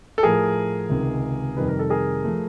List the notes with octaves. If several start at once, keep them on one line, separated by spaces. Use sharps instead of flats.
A4
A2 F3 A3 G#4 A#4
C#2 C3 D#3
F2 C3 D#3 G3 B4
A#4
A4
G#4 A#4
F3 A3